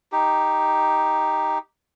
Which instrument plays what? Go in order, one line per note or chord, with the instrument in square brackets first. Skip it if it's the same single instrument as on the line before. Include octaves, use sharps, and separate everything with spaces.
[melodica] D#4 G4